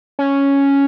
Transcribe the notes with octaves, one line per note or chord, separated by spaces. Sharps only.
C#4